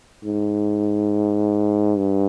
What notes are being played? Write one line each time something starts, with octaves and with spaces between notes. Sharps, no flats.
G#2
G2